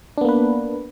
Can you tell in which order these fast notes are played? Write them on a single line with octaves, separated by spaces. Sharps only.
D4 B3 A#3 B4